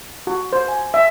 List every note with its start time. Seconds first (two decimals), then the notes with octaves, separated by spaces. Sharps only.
0.27 F#4
0.53 C5
0.68 G#5
0.94 E5